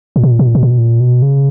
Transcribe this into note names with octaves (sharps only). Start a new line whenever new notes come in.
A#2
B2
A#2
B2
A#2
B2
A#2
B2
A#2
B2
C#3